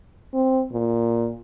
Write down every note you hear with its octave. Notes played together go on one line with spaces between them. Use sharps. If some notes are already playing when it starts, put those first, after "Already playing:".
C4
A#2